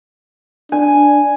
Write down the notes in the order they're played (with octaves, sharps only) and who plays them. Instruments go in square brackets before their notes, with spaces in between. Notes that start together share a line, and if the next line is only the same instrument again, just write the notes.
[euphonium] D4 [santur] G#5